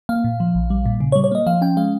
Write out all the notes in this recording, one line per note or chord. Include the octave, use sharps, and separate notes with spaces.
A#3 F5
A#2
F3
A#1
G3
A#2
C#3
C#5
G3
C#5
A#3 D#5
F3 F5
C#4 G5
G#3 F5